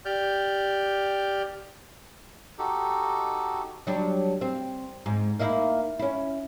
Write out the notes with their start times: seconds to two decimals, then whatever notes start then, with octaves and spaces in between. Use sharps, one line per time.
0.05 G4 D5 F6 G6
2.59 D#4 F#4 G4 A4
3.87 F#3 G3 D4
4.41 C4
5.06 G#2
5.39 A#3 D#4 E4
5.99 C#4 E4